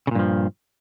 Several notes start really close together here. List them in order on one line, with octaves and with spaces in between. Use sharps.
C#3 A#2 G2 F3